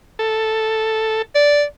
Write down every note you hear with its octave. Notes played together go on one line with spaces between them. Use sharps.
A4
D5